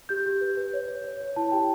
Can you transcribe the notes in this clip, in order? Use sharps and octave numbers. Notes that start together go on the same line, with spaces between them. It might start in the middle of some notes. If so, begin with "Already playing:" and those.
G4 G6
G4
B4
B4
C#5
C#5
C#5
C#5
E4 A5
G4 G5